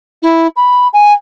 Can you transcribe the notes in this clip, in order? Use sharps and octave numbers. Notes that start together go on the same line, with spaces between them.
E4
B5
G#5